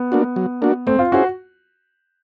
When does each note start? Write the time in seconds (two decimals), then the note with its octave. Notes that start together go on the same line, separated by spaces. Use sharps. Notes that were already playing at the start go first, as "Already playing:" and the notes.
Already playing: B3
0.12 A#3 D4 F#4
0.36 F#3
0.62 A#3 D4 F#4
0.87 A3 C4
0.99 F4
1.12 C#4 E4 F#4 G#4 C5